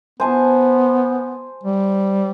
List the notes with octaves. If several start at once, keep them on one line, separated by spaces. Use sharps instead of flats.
B3 C5 G#5 A5
G3